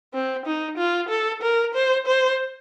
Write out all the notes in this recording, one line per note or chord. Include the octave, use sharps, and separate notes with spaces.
C4
D#4
F4
A4
A#4
C5
C5